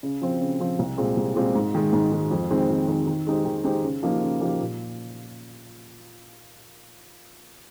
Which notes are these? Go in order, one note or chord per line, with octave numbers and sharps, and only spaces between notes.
C#3
F3 C4
C#3
F3 C4
C2
A#2 G#3 C4
C2
A#2 G#3 C4
G#2
D#3 G#3
G#2
D#3 G#3
F2
D#3 G#3 C4
F2
D#3 G#3 C4
D#3
G#3 D#4 G4 C5
D#3
G#3 D#4 G4 C5
C#3
F3 A#3 D#4 G4
C#3
F3 A#3 D#4 G4
A#2